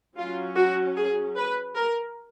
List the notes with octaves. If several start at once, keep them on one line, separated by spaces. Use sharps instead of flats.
F#3 C#4 F4
F#4
G#4
B4
A#4